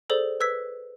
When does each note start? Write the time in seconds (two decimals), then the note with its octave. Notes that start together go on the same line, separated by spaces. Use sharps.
0.10 G#4 A4 C5 D5
0.40 B4 E6 G#6 B6